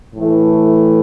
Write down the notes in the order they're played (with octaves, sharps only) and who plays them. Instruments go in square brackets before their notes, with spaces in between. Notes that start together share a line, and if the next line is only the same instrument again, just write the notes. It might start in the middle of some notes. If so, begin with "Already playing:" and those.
[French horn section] A2 E3 A3